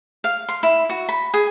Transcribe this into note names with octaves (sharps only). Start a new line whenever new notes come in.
F5
C6
E4
F#4
B5
G#4